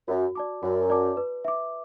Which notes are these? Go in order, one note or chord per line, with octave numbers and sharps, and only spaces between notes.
F#2 F#4
D5 A5 D6
F#2 F#4
D5 A5 D6
B4
E5 D6